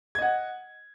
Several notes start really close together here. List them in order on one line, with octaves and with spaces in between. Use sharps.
G#6 D#5 F#5